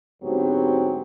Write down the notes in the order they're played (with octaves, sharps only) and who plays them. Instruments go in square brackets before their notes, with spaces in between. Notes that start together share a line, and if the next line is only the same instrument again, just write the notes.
[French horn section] D2 G#2 F#3 B3 C4 G4